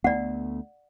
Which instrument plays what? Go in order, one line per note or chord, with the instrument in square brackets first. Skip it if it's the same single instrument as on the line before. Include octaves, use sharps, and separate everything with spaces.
[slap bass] D2 A3 B3 [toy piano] D5 F#5